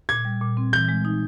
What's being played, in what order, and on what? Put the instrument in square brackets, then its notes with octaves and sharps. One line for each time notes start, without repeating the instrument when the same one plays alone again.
[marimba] A#2 [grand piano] G#6
[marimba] G3
A#2
C4
[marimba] E3 [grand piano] G6
[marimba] G#3
D#4